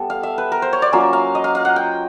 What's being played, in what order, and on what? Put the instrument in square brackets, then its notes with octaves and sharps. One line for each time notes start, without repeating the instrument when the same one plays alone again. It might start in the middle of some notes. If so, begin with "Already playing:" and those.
Already playing: [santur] G3 B3 A4
F5
E5
B4
A#4
C5
C#5
D5
F#3 A#3 C#4 F4 E5
F5
D#5
F5
F5
F#5
G5